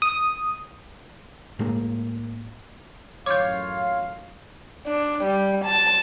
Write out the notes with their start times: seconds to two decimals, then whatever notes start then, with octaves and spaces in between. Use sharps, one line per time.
0.02 D#6
1.59 A2 G#3 A#3
3.26 A1 F#2 F4 C#5 F5 D6 G6
4.87 D4
5.24 G3
5.65 A5